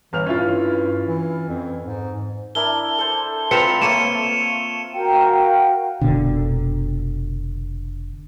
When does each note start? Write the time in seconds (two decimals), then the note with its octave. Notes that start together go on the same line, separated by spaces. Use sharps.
0.13 G1 E3 F6 F7
0.26 G2 C#4 E4 F4
1.07 E3
1.49 F2
1.84 G#2
2.55 D4 E4 A#4 G7
2.99 A4 C5
3.51 C4 F4 B4 A#5 E6 C#7 E7 F7
3.82 A3 A#3 C#5 C#7 D#7 E7
4.94 F#4 A#4 F5 G5
6.01 F1 B2 D3